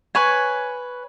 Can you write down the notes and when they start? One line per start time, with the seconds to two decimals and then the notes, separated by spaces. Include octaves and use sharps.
0.15 B4 C#5 G#5